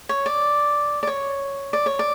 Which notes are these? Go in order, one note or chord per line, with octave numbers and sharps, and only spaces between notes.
C#5
D5
D5
C#5
D5
C#5
D5